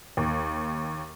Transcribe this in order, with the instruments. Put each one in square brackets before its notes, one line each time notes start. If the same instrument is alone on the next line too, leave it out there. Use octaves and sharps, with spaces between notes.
[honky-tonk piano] D#2